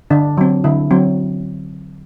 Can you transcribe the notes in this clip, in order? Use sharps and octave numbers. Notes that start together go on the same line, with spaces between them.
D3 D4
F#3 C4
D3 E4
F#3 C4